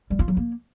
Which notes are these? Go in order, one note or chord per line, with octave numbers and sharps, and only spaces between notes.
G3
F4
F#3
A#3